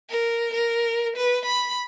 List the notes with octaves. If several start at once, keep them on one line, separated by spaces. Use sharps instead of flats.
A#4
A#4
B4
B5